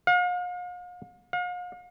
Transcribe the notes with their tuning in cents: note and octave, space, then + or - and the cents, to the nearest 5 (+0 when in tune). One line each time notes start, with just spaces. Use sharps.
F5 +40
F5 +40